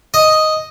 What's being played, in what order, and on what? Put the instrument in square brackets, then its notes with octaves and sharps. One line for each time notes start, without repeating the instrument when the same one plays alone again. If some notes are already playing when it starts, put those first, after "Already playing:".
[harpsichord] D#5